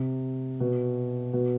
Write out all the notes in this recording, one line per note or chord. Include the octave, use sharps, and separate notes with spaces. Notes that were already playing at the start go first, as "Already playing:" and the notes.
Already playing: C3
B2
B2